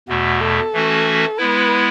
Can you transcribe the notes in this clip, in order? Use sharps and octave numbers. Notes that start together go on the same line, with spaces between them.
E2 B2 A3 F#4
A4
E3 A3 C#4 F#4
G#3 B3 E4 B4